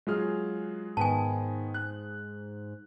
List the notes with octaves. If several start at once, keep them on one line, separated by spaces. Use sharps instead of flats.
F#3 G#3 F4 G#4 F6
G#2 D#3 B3 G#5 A5
F#6